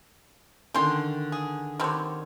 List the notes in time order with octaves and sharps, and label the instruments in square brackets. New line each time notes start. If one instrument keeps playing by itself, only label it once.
[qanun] D3 D#3 C#4 [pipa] G5 C6
[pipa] G#4
[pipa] D3 G3 C4 [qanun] D#3 C#5